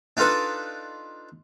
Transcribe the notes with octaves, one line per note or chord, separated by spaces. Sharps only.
D4 D#4 F4 A4 B4